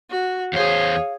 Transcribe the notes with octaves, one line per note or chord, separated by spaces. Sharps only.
F#4
E2 G#4 C5 C#5 F5